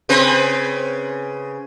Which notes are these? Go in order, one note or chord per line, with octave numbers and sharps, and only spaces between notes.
C#3 C4 B4